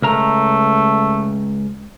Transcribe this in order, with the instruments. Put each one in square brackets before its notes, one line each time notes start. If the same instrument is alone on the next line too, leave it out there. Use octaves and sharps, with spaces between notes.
[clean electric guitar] C#2 A#4 A#5 [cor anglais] A3